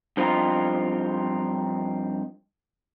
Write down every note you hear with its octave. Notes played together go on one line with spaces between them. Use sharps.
G2 F3 B3 C4 D#4 F4